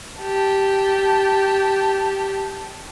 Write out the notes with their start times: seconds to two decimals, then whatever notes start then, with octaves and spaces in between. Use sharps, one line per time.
0.20 G4 A5